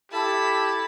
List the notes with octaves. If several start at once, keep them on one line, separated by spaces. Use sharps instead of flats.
E4 G4 A4 A5 B5